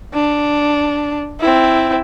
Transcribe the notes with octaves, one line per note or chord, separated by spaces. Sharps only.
D4
C4 E4